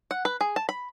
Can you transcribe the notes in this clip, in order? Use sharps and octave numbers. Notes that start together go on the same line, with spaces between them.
F#5
B4
G#4
A5
B5